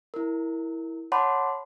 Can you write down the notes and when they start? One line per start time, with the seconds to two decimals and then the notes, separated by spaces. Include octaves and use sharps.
0.14 E4 A#4
1.12 C#5 F#5 A5 B5 C6 D6